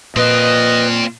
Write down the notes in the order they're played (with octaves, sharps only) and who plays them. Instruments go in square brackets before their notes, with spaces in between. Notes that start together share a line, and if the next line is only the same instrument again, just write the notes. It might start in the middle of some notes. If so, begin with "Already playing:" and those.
[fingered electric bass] A#2 [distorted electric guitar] C4 F4 [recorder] B4 [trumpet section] D#5